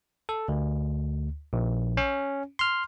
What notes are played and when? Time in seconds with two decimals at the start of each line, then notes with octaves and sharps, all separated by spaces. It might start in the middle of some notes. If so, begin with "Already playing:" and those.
0.29 A4
0.48 D2
1.53 A#1
1.97 C#4
2.59 C6 F6